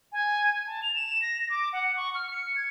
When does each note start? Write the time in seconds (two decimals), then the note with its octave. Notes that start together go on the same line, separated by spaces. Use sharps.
0.12 G#5
0.67 A5
0.82 F7
0.95 E7
1.22 A#6
1.49 D6
1.73 F#5
1.96 C#6
2.15 F6
2.31 C#7
2.56 G#6